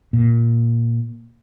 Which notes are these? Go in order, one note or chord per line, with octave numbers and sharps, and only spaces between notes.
A#2